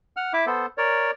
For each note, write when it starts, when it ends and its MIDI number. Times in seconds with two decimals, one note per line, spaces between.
0.17 0.33 78
0.17 0.33 89
0.33 0.46 64
0.33 0.46 76
0.33 0.46 86
0.47 0.66 59
0.47 0.66 69
0.47 0.66 72
0.78 1.11 70
0.78 1.11 73
0.78 1.11 74